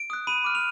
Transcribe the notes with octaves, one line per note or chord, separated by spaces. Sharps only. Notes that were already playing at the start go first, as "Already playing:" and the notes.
Already playing: D7
D#6 F#6
B5 D#7
D6 F6
F7